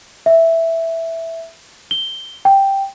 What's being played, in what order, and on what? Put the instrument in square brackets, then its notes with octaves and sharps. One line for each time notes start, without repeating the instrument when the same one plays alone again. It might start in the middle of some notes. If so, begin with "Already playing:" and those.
[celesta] E5
G7
G5